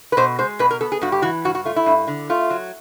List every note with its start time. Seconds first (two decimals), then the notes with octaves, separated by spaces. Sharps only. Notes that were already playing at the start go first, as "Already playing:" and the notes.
0.12 B4
0.17 B2 C5
0.38 G#3 C5
0.59 B2 B4
0.71 A#4
0.81 B3 A4
0.92 G#4
1.01 G2 F#4
1.12 G4
1.22 E3 F#4
1.45 G2 F#4
1.55 F#4
1.65 A3 F4
1.76 E4
1.86 G2
2.08 D3
2.30 A3 F4
2.50 F#3